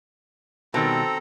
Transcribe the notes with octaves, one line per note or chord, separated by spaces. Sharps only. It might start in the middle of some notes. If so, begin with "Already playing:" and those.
B2 D#3 G3 C4 A4 A#5